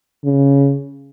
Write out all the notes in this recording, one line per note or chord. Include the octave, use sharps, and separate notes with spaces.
C#3